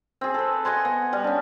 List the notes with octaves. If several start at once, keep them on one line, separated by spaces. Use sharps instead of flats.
C4 G#4
A4 B4
D#5 F#5 G#5 C6
B3
G3
C#4 D4